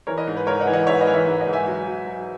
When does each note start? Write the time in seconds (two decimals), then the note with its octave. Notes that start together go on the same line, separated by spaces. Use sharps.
0.07 E3 A#4 C#5
0.17 B4 D#5
0.27 G#2
0.37 B4
0.47 G#2 A#4 C#5
0.60 D#5 F#5
0.67 E3
0.73 D#5 F#5
0.87 G#2 C#5 E5
1.01 B4 D#5
1.07 E3
1.14 C#5 E5
1.27 G#2
1.40 D#5 F#5
1.47 G#2
1.53 E5 G#5
1.67 F#3
1.87 F#3
2.06 F#3